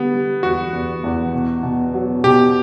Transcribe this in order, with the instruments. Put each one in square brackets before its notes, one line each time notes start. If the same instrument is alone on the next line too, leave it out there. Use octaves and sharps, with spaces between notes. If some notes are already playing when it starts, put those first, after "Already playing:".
Already playing: [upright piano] D3 G3 [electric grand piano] B3
[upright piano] G3
[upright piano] E2 [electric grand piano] F#4
[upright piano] E2
E2
B2
B2
F#3
[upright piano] B2 [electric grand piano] G4